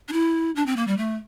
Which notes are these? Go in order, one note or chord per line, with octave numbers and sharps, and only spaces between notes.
D4
E4
D4
C4
A#3
G3
A3